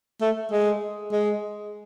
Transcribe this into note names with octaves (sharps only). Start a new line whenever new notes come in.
A3
G#3
G#3